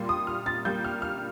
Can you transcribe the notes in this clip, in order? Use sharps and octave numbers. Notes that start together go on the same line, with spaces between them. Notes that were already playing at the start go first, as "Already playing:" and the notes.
Already playing: A#2 G3 A#3 C6
D#6
F6
A6
A#2 G3 A#3 G6
F6
F6